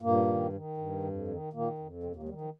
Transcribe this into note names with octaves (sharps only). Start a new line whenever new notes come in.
G2 A#2 A#3
D#3
D#3
G2
F2
D#3
A#2 D#3 A#3
F2
D#2 C3 C4
A#2 A#3
G#3
D#3 G3
F3